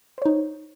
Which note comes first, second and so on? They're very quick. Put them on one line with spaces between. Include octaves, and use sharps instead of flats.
C5 C#5 D#4